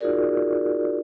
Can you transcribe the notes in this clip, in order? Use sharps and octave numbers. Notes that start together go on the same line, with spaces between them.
D#4 F4 F#4 G#4 A#4 D5